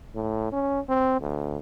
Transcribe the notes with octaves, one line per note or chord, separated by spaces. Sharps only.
A2
C#4
C4
D2